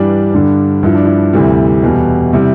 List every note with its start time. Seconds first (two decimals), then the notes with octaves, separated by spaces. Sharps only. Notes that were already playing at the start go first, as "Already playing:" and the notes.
Already playing: G2 E3 G3 D4
0.34 G2 D3 G3
0.83 G2 F3 E4
0.95 D4
1.05 E4
1.33 D2 C3 E3 G3
1.83 E2 B2 G3
2.32 C3 G3 E4